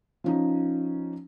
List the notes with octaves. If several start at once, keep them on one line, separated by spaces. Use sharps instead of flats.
F3 C#4 D#4